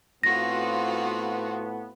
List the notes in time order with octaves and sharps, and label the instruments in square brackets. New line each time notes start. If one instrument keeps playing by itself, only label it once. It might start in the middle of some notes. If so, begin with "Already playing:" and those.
[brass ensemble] A2 B3 [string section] C4 F4 F#4 [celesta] A#6